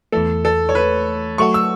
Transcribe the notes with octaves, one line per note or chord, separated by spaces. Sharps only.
E2 E3 A3 A4
A4
C#5
B4
F#3 A3 F#4 A4 C#6
E6